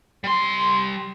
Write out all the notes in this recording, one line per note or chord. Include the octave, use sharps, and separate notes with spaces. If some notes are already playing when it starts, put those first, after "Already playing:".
G3 C6